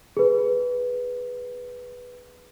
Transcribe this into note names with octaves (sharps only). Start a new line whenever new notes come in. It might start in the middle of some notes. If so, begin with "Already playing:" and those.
G#4 B4